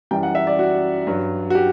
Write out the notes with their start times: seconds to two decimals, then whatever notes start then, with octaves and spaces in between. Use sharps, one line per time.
0.11 F#2 E3 G3 G5
0.23 F#5
0.35 E5
0.47 D5
0.59 F#4
1.07 G2 F#3
1.50 F#4
1.55 G4